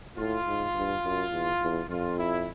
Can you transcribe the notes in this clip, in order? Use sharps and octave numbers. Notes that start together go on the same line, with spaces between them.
A2 F4
G#2
G2
F#2
E2
E2
F2 F4
E4